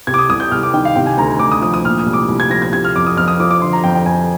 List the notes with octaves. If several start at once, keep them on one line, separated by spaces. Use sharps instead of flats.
C3 G#6
D6
D#6
C2 D#6
G6
C2 F6
D6
D#3 G5
F5
C3 G5
G#5
D2 A#5
D2 D6
D#6
F3 D#6
D#6
A#2 F6
D#6
C2
D6
C2
G#6
F3 A#6
G#6
C3 G#6
F6
F2 D6
D#6
F2 F6
D#6
F3 D6
D6
D3 C6
A#5
F2 G5
G5
F2 G#5